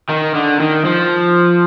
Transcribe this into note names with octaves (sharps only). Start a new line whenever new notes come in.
D#3
D3
D#3
F3